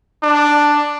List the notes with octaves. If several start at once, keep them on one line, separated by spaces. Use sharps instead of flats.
D4